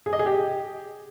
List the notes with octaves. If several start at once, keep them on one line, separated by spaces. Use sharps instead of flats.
G#4
D#5
G#4
G4